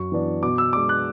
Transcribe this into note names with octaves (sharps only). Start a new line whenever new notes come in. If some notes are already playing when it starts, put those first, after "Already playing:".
Already playing: F#2 C#6
E3 B3 D4
B2 D6
E6
G#3 D4 D6
F#6